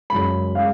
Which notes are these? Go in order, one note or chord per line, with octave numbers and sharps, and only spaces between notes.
F#2 C#3 G#3 B5
G#3 C#4 F5